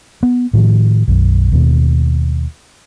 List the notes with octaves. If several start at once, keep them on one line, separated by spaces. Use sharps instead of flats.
B3
A2 D#3 F3
B1 F#2
D#2 B2